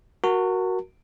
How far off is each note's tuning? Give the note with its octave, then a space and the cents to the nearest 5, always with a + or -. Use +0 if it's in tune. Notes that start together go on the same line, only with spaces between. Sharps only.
F#4 +0 A#4 +10 A5 +45